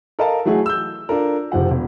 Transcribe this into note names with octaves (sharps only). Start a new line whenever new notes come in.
A4 A#4 D#5 F5 A5
E3 F#3 A3 F#4 G#4
E6 G6
D4 F4 A4 A#4
F#1 C3 F3 F#5
E1